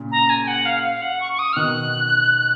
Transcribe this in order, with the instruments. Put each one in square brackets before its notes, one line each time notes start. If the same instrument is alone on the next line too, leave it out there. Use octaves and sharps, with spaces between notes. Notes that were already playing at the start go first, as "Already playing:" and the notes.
Already playing: [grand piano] A#2 C#3
[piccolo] A#5
G#5
F#5
F5
F5
F#5
C#6
C#6
D#6
F6
[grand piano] B2 D#3 [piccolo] F#6